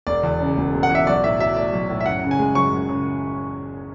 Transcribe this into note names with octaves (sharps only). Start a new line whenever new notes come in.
E1 D5
E2
C#3
E1
E1
F#5
E2 E5
B1 D5
A2 E5
F#3 E5
A3 D5
B1
A2
E5
F#2 F#5
C#3
G#5
G#3
F#2 C#6
F#2
C#3